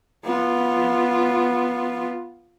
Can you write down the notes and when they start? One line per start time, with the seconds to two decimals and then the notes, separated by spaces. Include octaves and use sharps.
0.24 B3 F4